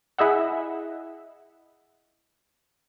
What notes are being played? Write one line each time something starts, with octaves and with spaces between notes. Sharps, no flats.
E4 G#4 D#5 E5 F#5